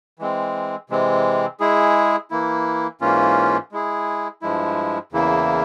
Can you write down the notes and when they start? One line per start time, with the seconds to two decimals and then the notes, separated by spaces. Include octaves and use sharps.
0.19 E3 G#3 C4
0.90 C3 E3 G#3 C4
1.60 G#3 E4 G#4
2.31 E3 A#3 E4
3.01 G#2 E3 A#3 C#4 F4
3.72 G#3 E4 G#4
4.42 G2 F3 G#3 E4
5.12 E2 C#3 E3 A#3 E4